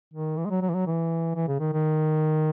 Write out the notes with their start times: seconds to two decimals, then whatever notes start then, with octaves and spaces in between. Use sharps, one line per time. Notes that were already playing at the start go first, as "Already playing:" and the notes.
0.14 D#3
0.37 E3
0.45 G#3
0.50 F#3
0.62 F#3
0.69 E3
0.74 F#3
0.87 E3
1.35 E3
1.48 C#3
1.60 D#3
1.73 D#3